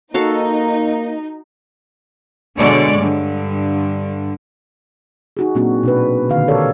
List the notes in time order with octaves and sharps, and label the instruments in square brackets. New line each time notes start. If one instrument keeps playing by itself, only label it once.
[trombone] A#3 [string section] D#4 [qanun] F#4 A4 F5
[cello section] B2 D3 G#3 C#5 D5
G2 D3
[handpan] D#4 F#4 G#4
A#2 F#3 A#3 C4 D4 F#4
B2 D4 B4
D3 D#3 F5
G4 A4 A#4 C#5 D5